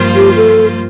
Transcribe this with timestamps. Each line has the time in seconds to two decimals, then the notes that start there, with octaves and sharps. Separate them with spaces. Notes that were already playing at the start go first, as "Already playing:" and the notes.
Already playing: G2 F3 A#3 F4 C5
0.15 G4
0.37 A4